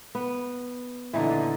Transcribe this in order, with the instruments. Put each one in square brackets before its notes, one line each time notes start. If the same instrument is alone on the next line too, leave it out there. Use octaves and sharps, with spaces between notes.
[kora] B3
[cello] A#2 D3 [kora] E3 D#4